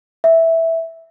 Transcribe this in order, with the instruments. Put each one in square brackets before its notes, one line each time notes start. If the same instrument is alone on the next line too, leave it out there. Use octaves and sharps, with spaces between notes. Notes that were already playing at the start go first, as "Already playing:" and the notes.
[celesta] E5